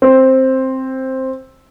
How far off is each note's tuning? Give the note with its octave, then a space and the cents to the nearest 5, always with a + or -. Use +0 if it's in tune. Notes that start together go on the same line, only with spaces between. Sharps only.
C4 +5